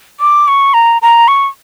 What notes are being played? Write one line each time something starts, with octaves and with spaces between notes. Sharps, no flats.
D6
C#6
A#5
A#5
C#6